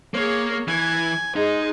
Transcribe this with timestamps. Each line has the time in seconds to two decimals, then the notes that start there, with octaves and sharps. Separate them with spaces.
0.14 A#3 G#4 C#5
0.68 E3 G#5
1.36 G#3 D#4 G#4